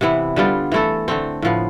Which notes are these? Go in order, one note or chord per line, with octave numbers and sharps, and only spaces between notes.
C3 E3 B3 E4
D3 G3 B3 F4
E3 A3 E4 A4
D3 A3 C4
A2 F3 B3